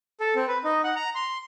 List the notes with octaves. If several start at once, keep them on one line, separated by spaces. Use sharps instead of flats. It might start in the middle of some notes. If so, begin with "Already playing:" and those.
A4
C4
B4
D#4
F#5
A#5
C6